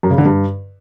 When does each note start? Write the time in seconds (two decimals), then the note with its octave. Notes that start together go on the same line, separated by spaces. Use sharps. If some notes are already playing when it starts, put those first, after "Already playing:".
0.03 F#2
0.11 C#3
0.18 D3
0.26 G2